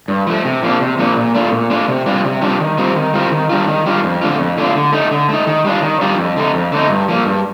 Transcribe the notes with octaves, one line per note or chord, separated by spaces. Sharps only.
G2
F3 A3
C3
F3 A#3 D4
C3
F3 A#3 D4
A#2
A3 D4 F4
A#2
A3 D4 F4
C3
G3 D4 F4
C3
G3 D4 F4
D#3
G3 C4 F4
D#3
G3 C4 F4
D#3
G3 D4 F4
D#3
G3 D4 F4
F2
D3 A3 D4 F4
F2
D3 A3 D4 F4
D3
A3 D#4
D3
A3 D#4
D#3
G3 D4 F4
D#3
G3 D4 F4
F2
D3 A3 D#4
F2
D3 A3 D#4
G2
F3 A#3
G2